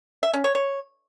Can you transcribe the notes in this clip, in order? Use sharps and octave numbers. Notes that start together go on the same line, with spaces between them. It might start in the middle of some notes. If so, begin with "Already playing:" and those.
E5
C#4
C#5
C#5